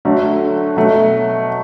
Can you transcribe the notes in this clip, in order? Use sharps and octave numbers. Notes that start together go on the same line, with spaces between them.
D3 F#3 A3
B2 F#3 A3